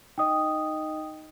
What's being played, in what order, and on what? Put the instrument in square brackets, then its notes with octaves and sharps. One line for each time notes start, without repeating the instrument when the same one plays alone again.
[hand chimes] D#4 D#5 [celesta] G5 D#6